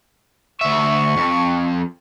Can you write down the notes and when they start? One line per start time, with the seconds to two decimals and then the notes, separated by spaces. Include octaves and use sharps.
0.61 D2 E5 C#6
1.17 F2